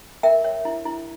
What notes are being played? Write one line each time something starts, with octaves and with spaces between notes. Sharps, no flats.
A#4 E5 G5
C#5
E4
E4